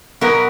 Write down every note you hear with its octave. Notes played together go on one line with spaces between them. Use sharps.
B2 F#3 B3 A#4